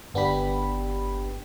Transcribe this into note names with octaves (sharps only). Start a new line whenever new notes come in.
G1 B3 D4 G4 B5